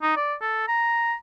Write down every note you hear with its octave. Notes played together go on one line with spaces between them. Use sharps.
D#4
D5
A4
A#5